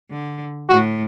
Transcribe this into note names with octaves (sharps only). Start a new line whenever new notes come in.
D3
A2 F#4